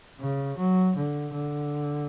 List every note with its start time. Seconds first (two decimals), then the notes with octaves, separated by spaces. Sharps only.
0.20 C#3
0.58 F#3
0.96 D3
1.34 D3